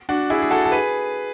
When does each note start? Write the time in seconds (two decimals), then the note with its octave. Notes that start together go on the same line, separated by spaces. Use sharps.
0.09 D4 F#4
0.30 E4 G#4
0.42 G#4
0.50 F#4 A4
0.65 A4
0.72 G#4 B4